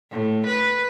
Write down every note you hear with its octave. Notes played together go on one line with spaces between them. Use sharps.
A2
B4